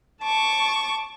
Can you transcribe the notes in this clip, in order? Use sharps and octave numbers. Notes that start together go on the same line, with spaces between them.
A5 C#6 D6